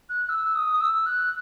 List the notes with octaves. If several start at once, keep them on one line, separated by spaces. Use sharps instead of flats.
F#6
E6
D#6
D#6
E6
F#6